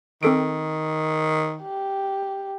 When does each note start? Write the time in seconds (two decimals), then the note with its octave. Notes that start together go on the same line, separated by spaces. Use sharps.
0.23 D#3 C4 A4 D7
1.63 G4